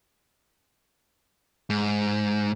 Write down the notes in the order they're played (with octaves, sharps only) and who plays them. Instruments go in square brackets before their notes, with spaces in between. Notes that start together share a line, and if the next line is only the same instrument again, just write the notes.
[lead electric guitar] G#2